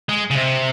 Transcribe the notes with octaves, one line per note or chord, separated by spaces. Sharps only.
G#3
C#3
C3